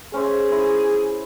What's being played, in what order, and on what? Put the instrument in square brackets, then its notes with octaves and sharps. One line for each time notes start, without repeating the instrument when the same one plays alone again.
[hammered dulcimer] C#4 C5 E5 [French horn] G#4
[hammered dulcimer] E4 C5 C6